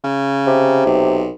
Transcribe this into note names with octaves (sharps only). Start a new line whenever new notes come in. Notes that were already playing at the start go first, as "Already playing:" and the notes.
C#3
C3
B1